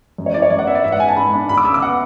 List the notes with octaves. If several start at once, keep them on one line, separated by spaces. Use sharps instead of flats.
F#2
C#5
E3 D5
C#5
F#2 D5
F#5
B3 E5
D5
G#2 E5
F#5
G#3 G#5
A5
G#2 B5
D4
D2 B5
D6
C#3 E6
D6
B3 F#5